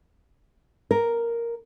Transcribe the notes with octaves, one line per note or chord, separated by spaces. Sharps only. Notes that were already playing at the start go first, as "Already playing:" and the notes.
A#4